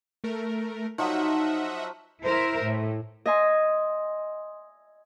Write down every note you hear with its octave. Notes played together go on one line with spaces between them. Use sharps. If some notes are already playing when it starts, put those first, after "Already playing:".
A3 A#4
F3 F#3 D#4 D#5 E5 F#5
E4 A#4 C5 E5
A2
D#5 E5 G#5 C6